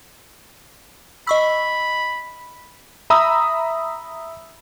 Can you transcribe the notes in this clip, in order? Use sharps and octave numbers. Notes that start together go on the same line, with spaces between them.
D#5 B5 C#6 E6
E5 A#5 B5 D#6 E6